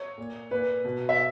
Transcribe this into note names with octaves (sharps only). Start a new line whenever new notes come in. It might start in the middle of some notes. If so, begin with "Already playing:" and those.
Already playing: C#5
A#2
A#2 B4
B2
E5